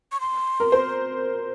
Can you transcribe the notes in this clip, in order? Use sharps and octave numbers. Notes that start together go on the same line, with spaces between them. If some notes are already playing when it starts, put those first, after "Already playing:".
C#6
C6
A#4
C5